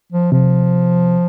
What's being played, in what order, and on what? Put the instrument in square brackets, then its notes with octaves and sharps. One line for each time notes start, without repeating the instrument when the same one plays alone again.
[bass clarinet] F3
[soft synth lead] C3 [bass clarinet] F3